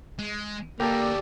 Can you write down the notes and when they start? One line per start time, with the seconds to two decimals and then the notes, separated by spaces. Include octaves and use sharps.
0.19 G#3
0.80 D2 G3 A#3 G4 A4 A#4 D5